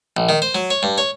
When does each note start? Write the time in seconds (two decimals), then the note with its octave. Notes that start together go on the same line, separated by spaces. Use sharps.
0.17 A#1
0.29 D#3
0.42 C5
0.55 F#3
0.70 C#5
0.83 G2
0.98 C#5